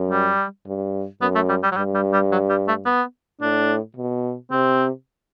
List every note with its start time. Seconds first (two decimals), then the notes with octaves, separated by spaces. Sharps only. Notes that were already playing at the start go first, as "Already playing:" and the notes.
Already playing: F#2
0.11 G3
0.67 G2
1.22 F#2 B3
1.35 A3
1.49 G3
1.63 G3
1.72 F#3
1.77 G2 G3
1.95 G3
2.13 G3
2.32 F#3
2.50 G3
2.68 A3
2.86 B3
3.41 A2 D4
3.96 B2
4.52 C3 C4